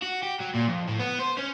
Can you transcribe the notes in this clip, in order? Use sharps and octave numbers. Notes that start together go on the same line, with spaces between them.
F#4
G4
F#3
A#2
F2
A2
B3
C5
C#4